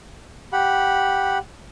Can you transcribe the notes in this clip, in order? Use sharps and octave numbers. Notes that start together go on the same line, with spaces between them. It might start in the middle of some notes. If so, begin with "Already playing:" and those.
G4 F#5 B5